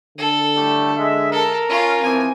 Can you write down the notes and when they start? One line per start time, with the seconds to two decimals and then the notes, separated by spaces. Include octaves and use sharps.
0.18 D3 A4
0.55 A2 G3 A3
0.98 G#3 E5
1.32 A4 A#4
1.69 C#4 F4
2.03 E3 F3 C4 G#5